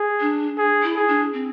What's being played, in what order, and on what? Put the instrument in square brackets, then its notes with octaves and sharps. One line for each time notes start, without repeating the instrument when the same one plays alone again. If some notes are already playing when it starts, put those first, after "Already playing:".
Already playing: [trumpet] G#4
[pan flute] D4
[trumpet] G#4
[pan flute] E4
[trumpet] G#4
[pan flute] D4
C4